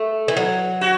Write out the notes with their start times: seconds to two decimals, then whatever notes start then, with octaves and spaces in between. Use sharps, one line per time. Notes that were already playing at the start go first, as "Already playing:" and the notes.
Already playing: A3
0.28 E3
0.37 F#3
0.81 F#4